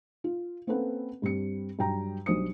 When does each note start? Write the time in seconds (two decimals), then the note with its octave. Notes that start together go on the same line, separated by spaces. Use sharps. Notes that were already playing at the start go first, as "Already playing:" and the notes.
0.24 F4
0.67 A#3 C4 C#4 A4 B4 F#5
1.22 G2 G3 C4 C#7
1.79 G2 F#3 G5 A#5
2.26 B1 G3 D4 C5 D#6 C#7